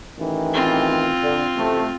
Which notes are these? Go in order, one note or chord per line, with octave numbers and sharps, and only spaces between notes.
A1 D#3 E3
C4 F4
D3
A1 C3 A3